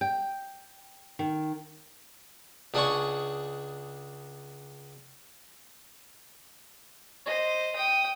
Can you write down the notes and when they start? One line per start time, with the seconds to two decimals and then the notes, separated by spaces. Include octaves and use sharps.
0.01 G5
1.19 D#3
2.74 C#2 D4 G#4 F#5 G#5 C#6
7.26 C5 D#5
7.76 G5 D#6